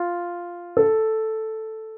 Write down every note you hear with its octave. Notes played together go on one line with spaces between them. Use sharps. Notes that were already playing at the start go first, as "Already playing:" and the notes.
Already playing: F4
A4